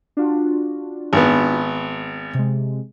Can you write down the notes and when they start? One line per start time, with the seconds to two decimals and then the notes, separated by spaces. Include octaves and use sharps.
0.17 D4 F4 F#4
1.13 G#1 B3
2.35 C3 G#3